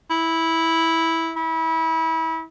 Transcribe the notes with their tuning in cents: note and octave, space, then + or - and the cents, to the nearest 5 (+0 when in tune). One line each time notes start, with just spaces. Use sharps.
E4 -10
E4 -30